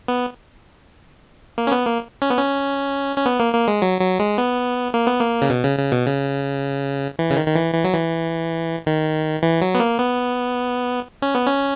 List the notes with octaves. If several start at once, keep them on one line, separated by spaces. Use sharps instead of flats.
B3
A#3
C#4
B3
A#3
C#4
B3
C#4
C#4
B3
A#3
A#3
G#3
F#3
F#3
G#3
B3
A#3
B3
A#3
C#3
B2
C#3
C#3
B2
C#3
E3
C#3
D#3
D#3
E3
E3
F#3
E3
D#3
E3
F#3
B3
A#3
B3
C#4
B3
C#4